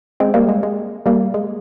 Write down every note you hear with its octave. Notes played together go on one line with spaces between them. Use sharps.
G#3 C4
G3 A#3
G#3
G#3
G3 A#3
G#3